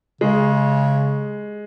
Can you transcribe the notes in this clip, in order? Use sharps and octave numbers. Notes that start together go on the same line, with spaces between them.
C#3 G#3